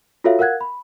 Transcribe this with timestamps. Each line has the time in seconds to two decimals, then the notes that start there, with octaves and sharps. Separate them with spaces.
0.24 F4 F#4 A4 C#5 E5 F5
0.39 A#4 F5 F#5 F#6 G#6
0.61 B5